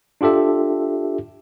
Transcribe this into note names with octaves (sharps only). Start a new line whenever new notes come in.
D4 F4 G4 A4 E5